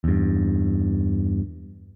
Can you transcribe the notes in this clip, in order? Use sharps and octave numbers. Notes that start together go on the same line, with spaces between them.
E2 G2